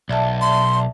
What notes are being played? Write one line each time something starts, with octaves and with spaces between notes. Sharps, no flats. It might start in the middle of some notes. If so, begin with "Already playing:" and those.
B1 D5 E5 A5
C6